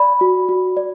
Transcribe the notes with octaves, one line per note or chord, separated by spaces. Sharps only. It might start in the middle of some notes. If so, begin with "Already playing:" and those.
Already playing: D5 B5
F#4
F#4
D5